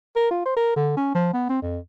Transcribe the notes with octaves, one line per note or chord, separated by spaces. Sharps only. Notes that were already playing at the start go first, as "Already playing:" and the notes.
A#4
F4
C5
A#4
D3
C#4
F3
B3
C4
F2